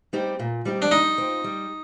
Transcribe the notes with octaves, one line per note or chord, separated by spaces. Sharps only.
G3 C4 D#4 G4
A#2
G3 C4 D#4 G4
D4
G3 D#4
C4 F4
G3